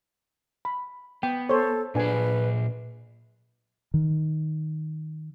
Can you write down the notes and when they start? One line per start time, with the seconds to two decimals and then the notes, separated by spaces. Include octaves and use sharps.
0.65 B5
1.23 B3 G5
1.49 A4 C5 C#5
1.95 A#2 D4 G#4 B4 G#5
3.94 D#3